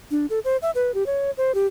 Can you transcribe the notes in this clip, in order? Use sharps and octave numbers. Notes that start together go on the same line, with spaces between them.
D4
A4
C5
E5
B4
G4
C#5
C5
G4